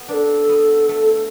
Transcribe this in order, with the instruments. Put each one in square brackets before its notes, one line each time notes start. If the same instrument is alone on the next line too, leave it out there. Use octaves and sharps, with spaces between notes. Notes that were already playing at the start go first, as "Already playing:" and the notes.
Already playing: [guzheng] B3
[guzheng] D4 [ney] B4
[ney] A4
[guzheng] B3
A3